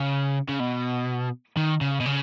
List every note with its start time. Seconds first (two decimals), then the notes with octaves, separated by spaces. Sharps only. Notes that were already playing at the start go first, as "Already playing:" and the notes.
Already playing: C#3
0.49 C#3
0.60 B2
1.57 D#3
1.81 C#3
2.00 B2
2.06 C#3